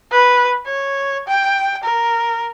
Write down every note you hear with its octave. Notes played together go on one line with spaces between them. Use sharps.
B4
C#5
G5
A#4